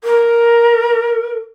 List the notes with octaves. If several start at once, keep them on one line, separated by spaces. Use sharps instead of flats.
A#4